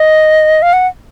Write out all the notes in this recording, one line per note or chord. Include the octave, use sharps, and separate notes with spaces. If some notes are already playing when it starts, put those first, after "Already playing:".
Already playing: D#5
F5
F#5